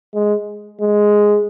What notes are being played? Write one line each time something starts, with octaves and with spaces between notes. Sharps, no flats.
G#3
G#3